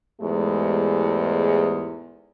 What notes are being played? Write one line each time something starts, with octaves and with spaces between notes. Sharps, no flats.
E2 G#2 G#3 A3 G4